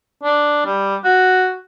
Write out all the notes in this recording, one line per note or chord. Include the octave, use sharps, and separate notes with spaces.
D4
G3
F#4